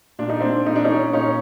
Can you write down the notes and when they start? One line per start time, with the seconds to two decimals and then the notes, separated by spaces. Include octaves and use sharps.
0.19 A#2 D4
0.29 D#4
0.41 C4 D4
0.66 A#2 D#4
0.76 D4
0.85 C#4 D#4
1.13 A#2 C#4 D#4